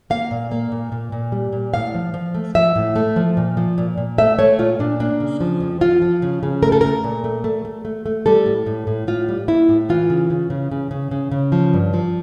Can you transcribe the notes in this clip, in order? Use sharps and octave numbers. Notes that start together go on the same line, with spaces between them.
A#3 F5
A#2
A#3
A#2
A#2
A#2
G3
A#2
A2 F5
F3
F3
A3
F3 E5
A2
A3
F3
A#2
F3
A#2
A#2
A3 E5
A3 C#5
A#2 F4
A#2 D4
A#3 D4
C#3
F3
F2
F3 F4
F3
C#3
C#3
A3 A#4
A4
A3 A#4
A#2
A3
A3
A3
A3
A3
G3 A4
A2
A2
A2
A2 F4
G3
A#3 E4
A2
E3 F4
C#3
C#3
C#3
C#3
C#3
C#3
C#3
F3
G2
F3